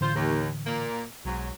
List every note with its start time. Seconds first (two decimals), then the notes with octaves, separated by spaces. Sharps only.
0.01 A2 D3 E3 F4 C5
0.15 D#2
0.66 A#2 A#3
1.25 B1 G#2 F#3